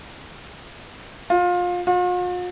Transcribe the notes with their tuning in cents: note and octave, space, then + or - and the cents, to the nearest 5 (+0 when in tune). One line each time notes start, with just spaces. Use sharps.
F4 +25
F4 +45